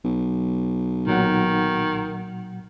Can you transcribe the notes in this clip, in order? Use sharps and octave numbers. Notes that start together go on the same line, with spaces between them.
B1
A#2 D#3 F#3 F#5